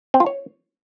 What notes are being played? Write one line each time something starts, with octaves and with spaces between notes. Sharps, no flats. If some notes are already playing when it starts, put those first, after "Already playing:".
C4
F4
C#5